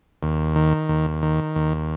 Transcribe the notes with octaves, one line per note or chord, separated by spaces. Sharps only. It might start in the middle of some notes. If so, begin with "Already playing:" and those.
D#2
D#3
D#2
D#3
D#2